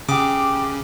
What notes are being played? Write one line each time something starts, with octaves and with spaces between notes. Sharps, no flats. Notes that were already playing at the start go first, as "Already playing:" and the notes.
C#3 G4 D6 D#6